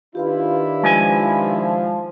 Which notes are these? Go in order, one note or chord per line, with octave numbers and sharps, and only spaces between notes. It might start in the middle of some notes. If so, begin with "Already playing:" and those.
D#3 D4 E4 F4 G4 B4 F5
F3 G#3 G#5